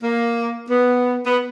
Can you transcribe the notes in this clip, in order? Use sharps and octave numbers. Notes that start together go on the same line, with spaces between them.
A#3
B3
B3